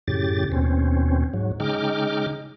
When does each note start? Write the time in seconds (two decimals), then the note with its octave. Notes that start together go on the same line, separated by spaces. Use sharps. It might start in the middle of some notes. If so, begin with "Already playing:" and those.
0.08 F#2 A2 C#3 G4 A6
0.52 D#2 B2 C4 C#4
1.34 G#2 F#3
1.60 C#3 G#3 D#4 G5 D6 F6